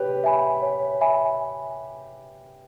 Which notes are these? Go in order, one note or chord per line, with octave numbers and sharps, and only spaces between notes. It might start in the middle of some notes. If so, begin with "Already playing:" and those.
Already playing: G4 B4 C#5
E5 G#5 B5
C#5
E5 G#5 B5